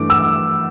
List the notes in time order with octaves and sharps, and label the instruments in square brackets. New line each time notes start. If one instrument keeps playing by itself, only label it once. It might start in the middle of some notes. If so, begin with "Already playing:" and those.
Already playing: [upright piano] G2 E3 A3 D6
E6